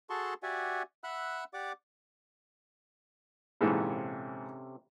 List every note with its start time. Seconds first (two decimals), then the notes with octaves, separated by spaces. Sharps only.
0.10 F#4 G#4 A4 A5 C6 C#6
0.43 F#4 G4 D5 E5 F#5 G#5
1.04 E5 F#5 B5 E6 F#6
1.54 G4 D5 F#5 D6
3.61 A#1 G#2 C3 E3 C#4 A4